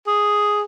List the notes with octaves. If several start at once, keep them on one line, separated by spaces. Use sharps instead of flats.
G#4